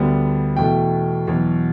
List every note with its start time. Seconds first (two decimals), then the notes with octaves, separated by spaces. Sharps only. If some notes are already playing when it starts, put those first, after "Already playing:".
Already playing: D2 D3 G3 B3
0.57 E2 B2 A3 G5
1.28 E2 B2 F#3